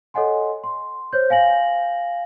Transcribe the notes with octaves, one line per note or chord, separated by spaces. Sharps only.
A4 C#5 D#5 F#5 G#5 C6
C6
C5 C#5 G6
F5 G#5 A#6 F#7